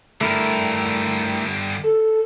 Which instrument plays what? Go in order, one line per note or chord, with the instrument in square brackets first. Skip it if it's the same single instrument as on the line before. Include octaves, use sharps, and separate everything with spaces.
[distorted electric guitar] G2 D3 [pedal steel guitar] A3 E4 A#4
[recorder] A4